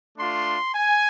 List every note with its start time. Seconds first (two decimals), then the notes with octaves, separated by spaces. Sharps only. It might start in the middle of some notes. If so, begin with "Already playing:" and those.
0.16 A3 D4 F4 C6
0.74 G#5